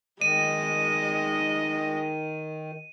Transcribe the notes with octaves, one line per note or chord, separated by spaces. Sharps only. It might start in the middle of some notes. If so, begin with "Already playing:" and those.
D#3 G#3 D#5 D#7